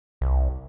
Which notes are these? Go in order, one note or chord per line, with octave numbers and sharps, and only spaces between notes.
C2